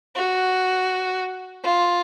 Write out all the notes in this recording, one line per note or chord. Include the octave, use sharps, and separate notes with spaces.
F#4
F4